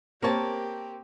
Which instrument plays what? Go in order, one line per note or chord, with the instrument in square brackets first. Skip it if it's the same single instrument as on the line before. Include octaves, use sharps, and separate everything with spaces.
[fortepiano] A#3 C4 C#5 [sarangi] G4 [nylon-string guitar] A#4 A5